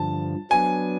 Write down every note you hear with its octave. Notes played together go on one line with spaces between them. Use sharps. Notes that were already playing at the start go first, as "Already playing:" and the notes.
Already playing: G2 D3 F3 A5
F#3 B3 D4 G#5